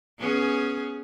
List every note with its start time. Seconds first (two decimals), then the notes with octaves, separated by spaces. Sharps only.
0.19 B3 C#4 G#4